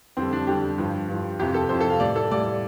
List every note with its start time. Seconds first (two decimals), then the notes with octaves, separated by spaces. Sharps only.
0.17 F2 D3 G3 C4
0.32 D4
0.47 F2 D3 G3 G4
0.78 G2 F3
1.08 G2 F3
1.39 F2 C3 F3 G4
1.54 A4
1.69 F2 C3 F3 C5
1.80 A4
1.90 F5
2.00 A2 G3 D5
2.15 A4
2.31 A2 G3 D5